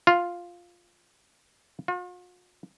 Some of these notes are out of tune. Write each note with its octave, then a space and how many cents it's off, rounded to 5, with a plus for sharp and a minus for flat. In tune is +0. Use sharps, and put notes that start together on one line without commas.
F4 +0
F4 +45